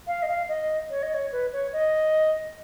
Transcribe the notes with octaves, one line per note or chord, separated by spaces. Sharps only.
F5
D#5
F5
D#5
C#5
D#5
C#5
B4
C#5
D#5